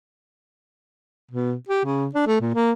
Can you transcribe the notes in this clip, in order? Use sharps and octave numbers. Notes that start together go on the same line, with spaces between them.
B2
G4
C#3
D4
A3
A#2
A#3